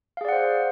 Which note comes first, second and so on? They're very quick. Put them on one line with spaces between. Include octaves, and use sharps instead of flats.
F5 G#4 D5 F#5 C5